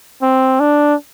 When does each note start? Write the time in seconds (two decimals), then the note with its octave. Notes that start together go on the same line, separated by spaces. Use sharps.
0.22 C4
0.60 D4